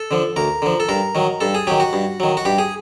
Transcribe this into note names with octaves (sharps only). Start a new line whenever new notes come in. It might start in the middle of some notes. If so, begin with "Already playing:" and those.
Already playing: A4
D3 F3
D2 A#4
D3 F3
A4
G2 A#4
D#3 F#3
G2 A4
G#4
D#3 F#3 G4
F#4
G2
D#3 F#3
F#4
G2 G4
G#4